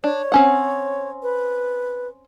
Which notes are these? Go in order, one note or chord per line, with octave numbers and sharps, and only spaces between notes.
D4 C#5
C4 C#4 F#5
B4